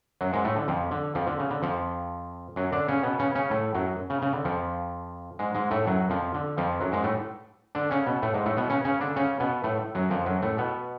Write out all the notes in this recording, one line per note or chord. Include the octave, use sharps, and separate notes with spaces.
F#2 F#3
G#2 G#3
A2 A3
D3
F2 F3
D3
F2 F3
D3
C#3
D3
F2 F3
F#2 F#3
D3 D4
C#3 C#4
B2 B3
C#3 C#4
C#3 C#4
A2 A3
F#2 F#3
C#3
C#3
D3
F2 F3
G#2 G#3
G#2 G#3
A2 A3
F#2 F#3
F2 F3
D3
F2 F3
F#2 F#3
G#2 G#3
A2 A3
D3 D4
C#3 C#4
B2 B3
A2 A3
G#2 G#3
A2 A3
B2 B3
C#3 C#4
C#3 C#4
D3 D4
C#3 C#4
B2 B3
A2 A3
F#2 F#3
F2 F3
F#2 F#3
A2 A3
B2 B3